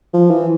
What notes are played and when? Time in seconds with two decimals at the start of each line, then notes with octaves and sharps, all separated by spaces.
0.14 F3
0.30 E3